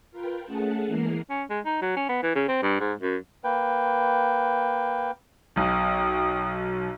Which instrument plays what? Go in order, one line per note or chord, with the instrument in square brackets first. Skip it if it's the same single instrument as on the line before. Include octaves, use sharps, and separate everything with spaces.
[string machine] F4 A#4 B4 G5
A3 C#4 G#4 F#5 A5
E3 G#3 A#3 A#4 C7
[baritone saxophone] C#4
G#3
D#4
F#3
C#4
B3
E3
C#3
C4
G2
G#2
F#2
[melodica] A#3 B4 G5
[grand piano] B1 B2 [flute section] G5 D#6